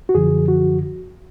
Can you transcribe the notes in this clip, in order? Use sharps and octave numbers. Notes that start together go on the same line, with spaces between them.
F#4
F#2 D3 F3 G#4
F#4